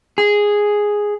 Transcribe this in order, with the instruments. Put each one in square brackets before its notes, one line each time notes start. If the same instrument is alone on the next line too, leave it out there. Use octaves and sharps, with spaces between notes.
[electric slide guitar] G#4